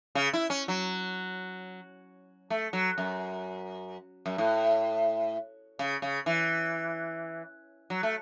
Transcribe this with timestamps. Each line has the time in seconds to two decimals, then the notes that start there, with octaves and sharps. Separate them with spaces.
0.15 C#3
0.33 E4
0.50 C#4
0.68 F#3
2.50 A3
2.73 F#3
2.98 F#2
4.26 F#2
4.38 A2
5.79 C#3
6.02 C#3
6.26 E3
7.90 F#3
8.03 A3